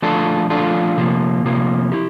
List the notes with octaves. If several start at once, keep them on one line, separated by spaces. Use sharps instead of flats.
F3 A3 D4 F4 A4
F3 A3 D4 F4 A4
C3 F3 A#3
C3 F3 A#3
E4 G4